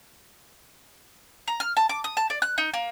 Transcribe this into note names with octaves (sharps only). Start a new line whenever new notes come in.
A#5
F6
A5
D6
D#6
A5
D5
F#6
D#4
A#3